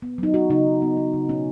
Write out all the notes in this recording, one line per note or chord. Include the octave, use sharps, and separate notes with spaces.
B3
F#3 D#4
F#3 F#4
C#3 D#4
C#3
B3
B3
C#3
B2 C#4